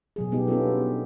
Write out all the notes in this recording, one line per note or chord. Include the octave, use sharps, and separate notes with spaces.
B2 F#3 G#4
G3 B3 D#4 G4
B3 C#4 D4 F4 A4